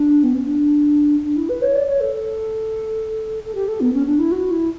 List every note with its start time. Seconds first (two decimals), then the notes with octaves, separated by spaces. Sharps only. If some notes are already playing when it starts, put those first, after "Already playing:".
Already playing: D4
0.23 B3
0.34 C#4
0.46 D4
1.23 D4
1.36 E4
1.49 B4
1.61 C#5
1.75 D5
1.87 C#5
2.00 A4
3.45 A4
3.54 G4
3.67 A4
3.80 B3
3.93 C#4
4.06 D4
4.18 E4
4.31 F#4
4.51 E4